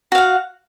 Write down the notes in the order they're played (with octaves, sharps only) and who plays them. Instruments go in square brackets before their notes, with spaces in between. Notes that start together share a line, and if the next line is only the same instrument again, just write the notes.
[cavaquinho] F#4
F5
F#5